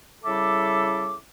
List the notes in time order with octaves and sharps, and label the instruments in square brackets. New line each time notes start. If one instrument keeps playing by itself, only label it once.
[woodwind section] C#3 G3 E4 A4 E5 D6